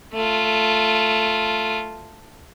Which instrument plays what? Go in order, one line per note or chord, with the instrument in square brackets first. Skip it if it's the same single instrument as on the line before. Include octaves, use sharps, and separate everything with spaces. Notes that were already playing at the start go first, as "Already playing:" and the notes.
[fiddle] A3 F4